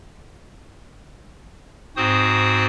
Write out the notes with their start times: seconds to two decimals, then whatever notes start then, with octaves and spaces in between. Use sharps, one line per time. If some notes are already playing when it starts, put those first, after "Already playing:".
1.97 G#2 C4 F#4 C5 D#6